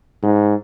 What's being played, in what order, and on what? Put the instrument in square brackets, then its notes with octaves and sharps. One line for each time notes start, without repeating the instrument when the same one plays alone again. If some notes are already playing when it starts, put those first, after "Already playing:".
[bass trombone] G#2